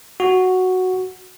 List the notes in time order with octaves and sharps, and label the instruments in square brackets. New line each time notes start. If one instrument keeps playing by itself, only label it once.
[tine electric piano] F#4